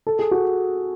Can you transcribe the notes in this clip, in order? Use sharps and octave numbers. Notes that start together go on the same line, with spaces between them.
A4
G#4
F#4